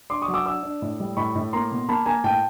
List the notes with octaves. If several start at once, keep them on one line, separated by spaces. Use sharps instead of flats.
D4 C6 D6
C#6 D#6
F#3
D6 E6
D4 D6 E6
D4
A2
G3
A2 B5 C#6
A2
A#3 A#5 C6
B2
A#3 A5 B5
A#3 G#5 A#5
A2 G5 A5